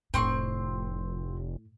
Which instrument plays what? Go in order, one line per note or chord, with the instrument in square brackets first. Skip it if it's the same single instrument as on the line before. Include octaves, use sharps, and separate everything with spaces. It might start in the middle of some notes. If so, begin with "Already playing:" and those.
[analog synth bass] F1 [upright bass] A2 [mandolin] C4 C6 C#6